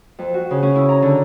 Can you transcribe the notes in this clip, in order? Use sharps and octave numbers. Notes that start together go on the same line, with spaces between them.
F2
F#4
C#3
C#4
E4
A#5
D3